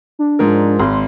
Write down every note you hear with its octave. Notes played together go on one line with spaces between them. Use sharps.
D4
G#2 F3 A#4
G#1 C6